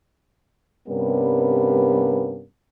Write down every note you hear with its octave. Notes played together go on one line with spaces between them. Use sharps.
G2 C3 G3 B3 C#4 A#4